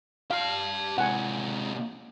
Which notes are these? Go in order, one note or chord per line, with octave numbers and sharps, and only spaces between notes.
G4 F5 A5
C3 G#3 F#5 G#5